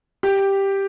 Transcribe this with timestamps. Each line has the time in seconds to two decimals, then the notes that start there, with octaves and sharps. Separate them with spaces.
0.23 G4